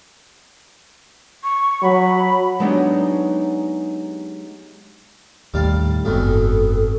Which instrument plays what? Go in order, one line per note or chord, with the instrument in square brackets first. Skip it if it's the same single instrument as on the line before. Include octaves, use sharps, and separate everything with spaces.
[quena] C#6
[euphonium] F#3 [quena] B5
[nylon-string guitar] F#3 G#3 B3 D4 D#4 G4
[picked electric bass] D#2 A2 [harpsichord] G3 F5 A5
[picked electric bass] F#1 G#2 [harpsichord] F2 B2 D#3 [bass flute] A4